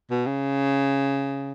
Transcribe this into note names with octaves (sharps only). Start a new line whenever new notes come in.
B2
C#3